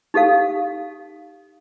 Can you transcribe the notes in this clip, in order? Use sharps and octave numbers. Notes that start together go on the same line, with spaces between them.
D#4 G4 A4 F5